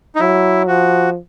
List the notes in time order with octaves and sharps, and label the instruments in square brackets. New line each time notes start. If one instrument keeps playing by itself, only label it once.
[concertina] D#4
[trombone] F#3 [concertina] E4
[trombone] F3 [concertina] F#4